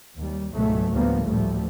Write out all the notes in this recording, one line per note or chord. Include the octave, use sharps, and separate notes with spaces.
D#2 G3
C#2 G#2 B2 F#3 A3
D2 A2 F3 G3 A#3 B3
A1 D2 A#2 F3 G3 A3